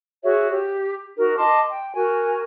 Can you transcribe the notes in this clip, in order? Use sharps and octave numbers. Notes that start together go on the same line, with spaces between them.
F#4 G#4 C#5 E5
G4
D#4 F#4 A#4
D#5 A5 C6 D6
G5
F#4 A#4 G#5